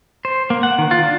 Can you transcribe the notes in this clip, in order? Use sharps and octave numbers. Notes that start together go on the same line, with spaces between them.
C5
A#3
F#5
D#3
F4
D4